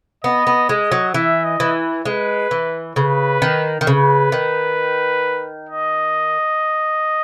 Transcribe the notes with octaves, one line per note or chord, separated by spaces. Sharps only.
B3 D#5
B3
G#3 D#5
F#3
E3 E5
D#5
E3
G#3 B4
E3
C#3 B4
D#3
D#3
C#3 B4
D#3
D#5